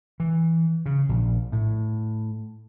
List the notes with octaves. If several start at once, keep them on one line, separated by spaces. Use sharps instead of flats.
E3
C#3
A#1
A2